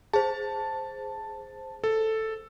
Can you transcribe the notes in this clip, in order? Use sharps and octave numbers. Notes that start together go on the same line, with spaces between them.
G#4 C5 A5
A4